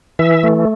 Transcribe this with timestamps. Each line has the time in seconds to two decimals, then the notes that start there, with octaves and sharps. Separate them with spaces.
0.19 E3 E5
0.43 A3